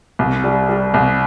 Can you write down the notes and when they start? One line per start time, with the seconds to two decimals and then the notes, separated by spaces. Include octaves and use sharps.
0.19 C2
0.44 G3
0.69 G3
0.94 C2